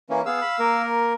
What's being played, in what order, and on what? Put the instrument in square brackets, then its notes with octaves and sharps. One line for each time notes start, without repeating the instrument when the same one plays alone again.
[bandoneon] E3 A#3 C#4
[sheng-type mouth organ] B3 G#4 [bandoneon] F5 E6
[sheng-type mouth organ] B5
A#3 A#4